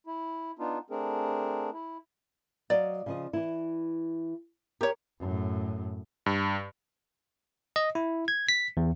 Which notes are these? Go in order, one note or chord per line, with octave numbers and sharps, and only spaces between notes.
E4
B3 D4 D#4 F4
A3 C4 D4 G#4 A#4
E4
F#3 D5 D#5 F5
C#3 F3 D#5
E3 E4
G4 A#4 C#5
F#2 A2
G2
D#5
E4
G#6
B6
E2